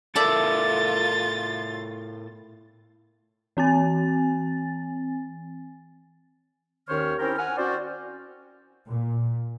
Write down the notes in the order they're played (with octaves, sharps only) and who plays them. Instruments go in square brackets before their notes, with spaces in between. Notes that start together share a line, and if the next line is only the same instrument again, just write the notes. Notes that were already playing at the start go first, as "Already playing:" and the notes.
[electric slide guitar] A2 A4 A#4 [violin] F4 A6 [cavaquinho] D5 E5 A5
[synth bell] E3 C4 G#5 A6
[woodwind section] D#2 D#3 C#4 C5 C#5 F6
C4 C#4 E4 G4 A#4
F#5 G#5 F6
C4 C#4 F#4 C5 D5
[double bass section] A#2